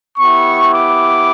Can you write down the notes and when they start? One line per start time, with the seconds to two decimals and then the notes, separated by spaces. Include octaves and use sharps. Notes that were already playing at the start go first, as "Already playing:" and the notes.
0.18 B3 E4 G4 C#6
0.72 D6